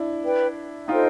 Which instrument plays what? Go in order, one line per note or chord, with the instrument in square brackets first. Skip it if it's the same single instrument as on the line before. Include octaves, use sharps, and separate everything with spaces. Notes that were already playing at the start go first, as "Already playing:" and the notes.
Already playing: [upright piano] D4 E4
[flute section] B4 D5 G5
[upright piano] D#4 F4 [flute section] A4 C5 D#5 G5